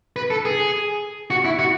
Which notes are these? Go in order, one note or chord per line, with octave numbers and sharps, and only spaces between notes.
B4
A4
G#4
F#4
E4
F#4